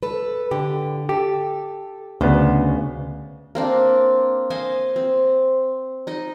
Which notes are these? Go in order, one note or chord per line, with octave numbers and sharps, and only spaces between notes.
A4 B4
D3 G4
G4 A4
D2 C#3 B3
A#3 C4 D4
C5 D#5 F5 G#5
C4
D#4 D#5